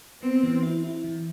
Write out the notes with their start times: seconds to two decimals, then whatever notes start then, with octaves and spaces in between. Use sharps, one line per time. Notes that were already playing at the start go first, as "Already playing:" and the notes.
0.22 B3 C4
0.43 E3
0.63 E4
0.83 E4
1.04 E3